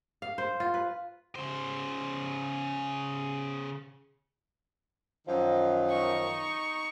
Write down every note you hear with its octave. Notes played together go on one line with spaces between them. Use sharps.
F5
C5
F4
B4
C#3 C5
F#2 D#3 F3
D#4 C#6